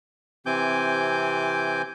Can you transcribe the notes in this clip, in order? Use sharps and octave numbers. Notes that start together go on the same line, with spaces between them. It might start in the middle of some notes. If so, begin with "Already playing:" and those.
C3 E3 C4 G#5 D6 G6